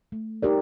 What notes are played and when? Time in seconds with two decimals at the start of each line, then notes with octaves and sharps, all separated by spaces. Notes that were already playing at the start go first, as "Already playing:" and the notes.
0.12 A3
0.42 D#4 G4 A#4 D5